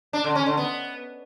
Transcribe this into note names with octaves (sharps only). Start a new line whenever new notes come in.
D4
D3
C#4
D3
B3